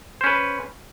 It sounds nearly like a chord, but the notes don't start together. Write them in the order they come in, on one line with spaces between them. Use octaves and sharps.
C5 C#4 B4